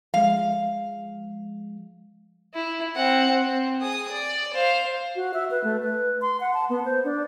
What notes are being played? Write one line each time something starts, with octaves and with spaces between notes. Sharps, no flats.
F3 G#3 F5
E4
C4 F#5
C4
G#4 D#6
D5
C5 F5
F#4
E5
B4
A3
B4
C6
F#5
A5
B3
C5
D4